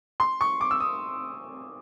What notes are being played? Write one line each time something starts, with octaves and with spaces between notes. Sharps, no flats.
C6
C#6
D6
E6
D#6